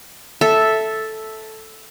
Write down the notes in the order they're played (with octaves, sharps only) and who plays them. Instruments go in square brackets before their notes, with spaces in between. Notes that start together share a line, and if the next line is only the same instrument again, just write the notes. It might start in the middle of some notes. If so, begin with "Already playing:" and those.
[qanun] A4 E5